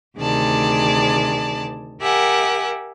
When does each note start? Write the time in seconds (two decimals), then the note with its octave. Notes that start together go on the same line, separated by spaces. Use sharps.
0.17 D2 C3 D#3 G#4 D5 A5
2.01 G4 A#4 E5 F#5 G#5